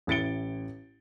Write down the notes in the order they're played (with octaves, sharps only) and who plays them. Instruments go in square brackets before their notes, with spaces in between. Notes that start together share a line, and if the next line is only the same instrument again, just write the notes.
[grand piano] A1 E4 A6 C#7 D7 G7